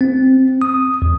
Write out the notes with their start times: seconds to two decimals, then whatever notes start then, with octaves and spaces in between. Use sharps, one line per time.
0.01 C4
0.62 D#6
1.02 E2